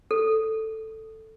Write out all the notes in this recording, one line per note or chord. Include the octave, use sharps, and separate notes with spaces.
A4